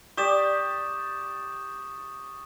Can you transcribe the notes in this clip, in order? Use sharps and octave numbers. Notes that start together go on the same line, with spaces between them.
G4 D5 C#6 D#6 E7